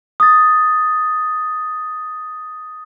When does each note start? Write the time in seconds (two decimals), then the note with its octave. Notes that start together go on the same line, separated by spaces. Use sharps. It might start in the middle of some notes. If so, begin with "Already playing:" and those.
0.20 D#6 A6